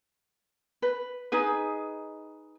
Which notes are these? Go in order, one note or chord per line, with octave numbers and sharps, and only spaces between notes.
B4
D#4 G#4 B4